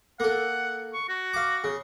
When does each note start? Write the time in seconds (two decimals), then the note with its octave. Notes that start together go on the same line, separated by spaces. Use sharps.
0.20 A#3 A4 F#5
0.93 C#6
1.09 F#4
1.33 F5 D6
1.64 C#3